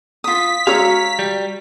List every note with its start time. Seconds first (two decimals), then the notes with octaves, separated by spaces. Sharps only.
0.24 F4 D#6 B6
0.67 F#4 C#5 F5 A#5 E6
1.19 G3